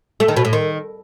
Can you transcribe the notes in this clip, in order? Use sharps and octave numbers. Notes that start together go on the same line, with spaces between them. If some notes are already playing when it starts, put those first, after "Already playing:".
A3
D#3
B2
A2
D#3